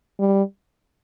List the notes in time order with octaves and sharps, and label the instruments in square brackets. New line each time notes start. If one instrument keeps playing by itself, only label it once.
[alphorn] G3